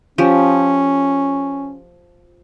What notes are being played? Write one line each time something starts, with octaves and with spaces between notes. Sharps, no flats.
F3 C#4 G4